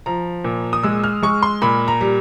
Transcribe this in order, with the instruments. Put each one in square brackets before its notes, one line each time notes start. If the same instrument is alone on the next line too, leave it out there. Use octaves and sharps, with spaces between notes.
[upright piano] F3 A#5
A#2
D#6
G#3 E6
F6
G#3 C#6
C6
A#2 B5
A#5
G3